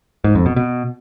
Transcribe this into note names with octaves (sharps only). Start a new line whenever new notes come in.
G#2
F2
B2
B2